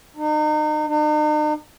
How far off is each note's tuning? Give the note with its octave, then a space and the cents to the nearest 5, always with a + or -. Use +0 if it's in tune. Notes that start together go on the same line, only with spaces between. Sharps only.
D#4 -35
D#4 -45